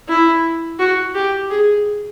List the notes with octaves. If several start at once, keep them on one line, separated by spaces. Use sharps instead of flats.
E4
F#4
G4
G#4